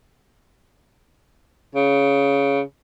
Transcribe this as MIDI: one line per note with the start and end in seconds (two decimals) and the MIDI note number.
1.75 2.61 49